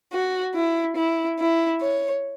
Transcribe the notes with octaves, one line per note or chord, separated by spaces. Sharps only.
F#4
E4
E4
E4
C#5